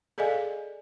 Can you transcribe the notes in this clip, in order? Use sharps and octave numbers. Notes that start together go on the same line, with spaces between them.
G#4 A4 D5 D#5 F5 G#5